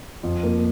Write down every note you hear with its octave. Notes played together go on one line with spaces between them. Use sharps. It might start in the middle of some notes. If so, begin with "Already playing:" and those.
F2
A#3